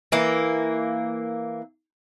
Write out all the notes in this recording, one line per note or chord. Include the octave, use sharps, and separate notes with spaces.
E3 A#3